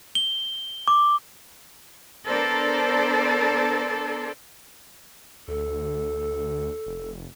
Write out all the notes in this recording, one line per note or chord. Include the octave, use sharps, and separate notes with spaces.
G7
D6
B3 D4 A4 A#4 C5 D5
D2 A4
F1